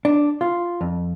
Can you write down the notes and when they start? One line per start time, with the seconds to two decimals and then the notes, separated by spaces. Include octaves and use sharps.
0.05 D4
0.41 F4
0.81 F2